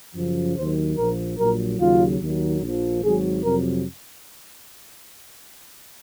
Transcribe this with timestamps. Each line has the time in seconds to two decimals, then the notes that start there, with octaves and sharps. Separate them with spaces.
0.15 F#2 C#3 F3
0.56 D#2 D#3 F#3 C5
0.97 A#1 A#2 F3 A#4
1.38 A#1 A#2 F#3 A#4
1.79 D#2 C#3 F#3 F4
2.21 D#2 D#3 F#3
2.61 A#1 A#2 F3
3.02 G#1 G#2 F#3 G#4
3.43 F2 C3 F#3 A#4